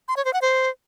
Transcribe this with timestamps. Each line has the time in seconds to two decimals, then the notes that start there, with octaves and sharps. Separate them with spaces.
0.08 C6
0.17 C#5
0.25 C5
0.33 F#5
0.42 C5